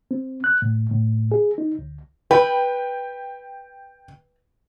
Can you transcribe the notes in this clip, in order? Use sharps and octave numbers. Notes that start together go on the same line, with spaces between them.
C4
F#6
A2
A2
G#4
D#4
D2
B4 G5